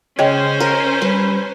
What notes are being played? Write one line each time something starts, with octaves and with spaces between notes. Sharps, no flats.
C#3 G#3 C#4 C5 C#5 D#5 G5
A#4
G3 B4